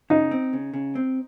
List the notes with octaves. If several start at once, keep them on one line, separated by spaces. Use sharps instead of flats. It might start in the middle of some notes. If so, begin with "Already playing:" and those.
C#3 D#4
C4
C#3
C#3
C4